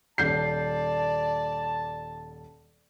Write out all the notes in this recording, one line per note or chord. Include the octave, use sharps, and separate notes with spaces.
D#1 D5 A5 G6 C7